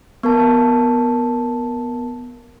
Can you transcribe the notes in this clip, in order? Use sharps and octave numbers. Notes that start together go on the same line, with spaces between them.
B3 A#4 A5